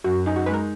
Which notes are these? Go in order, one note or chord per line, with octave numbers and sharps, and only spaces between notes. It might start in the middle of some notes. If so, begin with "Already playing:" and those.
F#2 F#4
D#4 G#4
F#4
G#3 B4
A#4